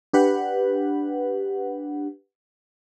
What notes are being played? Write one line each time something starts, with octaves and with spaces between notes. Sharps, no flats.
D4 G4 B4 F#5